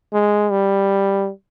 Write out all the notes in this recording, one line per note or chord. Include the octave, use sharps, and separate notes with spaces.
G#3
G3